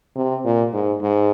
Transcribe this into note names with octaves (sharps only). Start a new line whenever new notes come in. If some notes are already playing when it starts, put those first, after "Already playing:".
C3
A#2
G#2
G#2